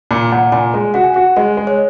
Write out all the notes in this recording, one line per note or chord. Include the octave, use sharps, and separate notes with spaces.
A#2
A#2 F#5
A#2 G#5
G#3
F#4 F#5
G#5
F#4 F#5
G#3 D#5
G#3
C#5